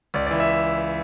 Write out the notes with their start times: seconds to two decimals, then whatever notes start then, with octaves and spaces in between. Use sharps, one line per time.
0.14 C#2 D5
0.27 D5
0.31 E3
0.40 E5